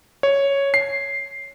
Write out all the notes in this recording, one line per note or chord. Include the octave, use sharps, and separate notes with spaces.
C#5
C7